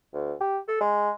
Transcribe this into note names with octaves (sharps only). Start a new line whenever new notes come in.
D2
G4
A4
G#3